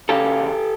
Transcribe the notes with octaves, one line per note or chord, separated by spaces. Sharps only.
C#3 G4 A4
F#2
E2